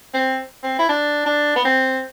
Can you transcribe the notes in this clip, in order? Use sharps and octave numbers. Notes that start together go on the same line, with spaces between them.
C4
C4
E4
D4
D4
B3
C4